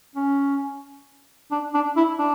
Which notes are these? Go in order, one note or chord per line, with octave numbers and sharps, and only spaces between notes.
C#4
D4
D4
E4
D4